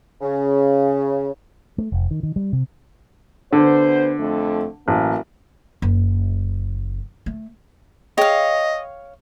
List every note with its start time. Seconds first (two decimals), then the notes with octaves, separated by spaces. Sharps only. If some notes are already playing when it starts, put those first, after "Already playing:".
0.22 C#3
1.78 A3
1.92 F1
2.11 D#3
2.23 D#3
2.36 G3
2.53 C3
3.53 D2 D3 B3 C5
4.20 F2 A3
4.88 A1 F#3 A#3
5.82 F#1
7.26 A3
8.18 G#4 C#5 D#5 F5 G5